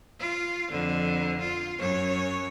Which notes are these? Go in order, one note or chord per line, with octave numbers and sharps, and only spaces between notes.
F4
F2 D3
F4
F#2 C#5